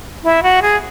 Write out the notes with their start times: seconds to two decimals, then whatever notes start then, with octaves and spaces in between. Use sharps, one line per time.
0.24 E4
0.43 F#4
0.62 G#4